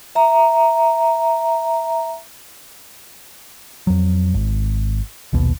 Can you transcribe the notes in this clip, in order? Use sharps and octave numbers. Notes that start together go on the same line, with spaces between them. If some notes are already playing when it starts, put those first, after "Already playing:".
E5 A#5
F2 F#3
G#1
A#1 D#2 B2